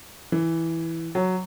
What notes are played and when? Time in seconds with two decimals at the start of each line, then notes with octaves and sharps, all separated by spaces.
0.32 E3
1.15 F#3